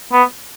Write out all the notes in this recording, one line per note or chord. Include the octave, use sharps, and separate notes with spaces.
B3